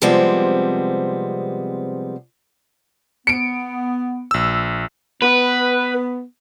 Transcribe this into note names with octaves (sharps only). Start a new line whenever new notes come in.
C3 F3 G3 G#3 B3 C4
B3 C#7 D7
A#1 E6
B3 B4